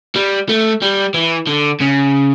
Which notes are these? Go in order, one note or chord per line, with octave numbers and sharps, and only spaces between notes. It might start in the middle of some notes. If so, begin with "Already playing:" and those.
G3
A3
G3
E3
D3
C#3